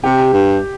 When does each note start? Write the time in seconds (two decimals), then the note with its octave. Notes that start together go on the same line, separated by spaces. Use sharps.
0.04 C3 G4
0.33 G2